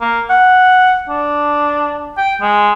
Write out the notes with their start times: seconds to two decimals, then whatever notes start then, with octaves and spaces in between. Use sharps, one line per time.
0.01 A#3
0.30 F#5
1.09 D4
2.17 G5
2.41 G#3